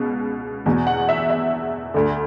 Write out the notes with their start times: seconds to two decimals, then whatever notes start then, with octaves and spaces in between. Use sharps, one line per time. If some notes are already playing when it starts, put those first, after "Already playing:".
Already playing: C#2 B2
0.66 E2 B2
0.87 F#5
1.09 E5
1.30 E5
1.94 D2 D3